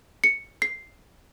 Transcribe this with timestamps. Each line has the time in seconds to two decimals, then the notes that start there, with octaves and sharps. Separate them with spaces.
0.24 C#7
0.62 C7